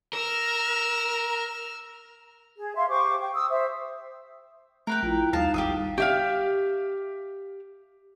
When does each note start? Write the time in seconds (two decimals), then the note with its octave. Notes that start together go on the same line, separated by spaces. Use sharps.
0.13 A#4 E6 F6
2.58 G#4
2.76 E5 F5 C6
2.89 G4 C5 C#6 D6
3.20 G5
3.35 D#6 E6
3.48 C5 E5
4.87 A3 A#4 B4 G5
5.03 A#1 E4 F4
5.33 D#2 G3 D#4 F5 A5
5.54 G#1 G4 E5 D#6
5.98 G4 E5 F5